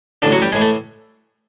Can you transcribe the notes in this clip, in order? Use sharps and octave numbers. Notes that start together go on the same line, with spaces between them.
A1 A2 D3 E3 D4
F#3 F#4
G3 G4
A2 E3 G#3 G#4
A3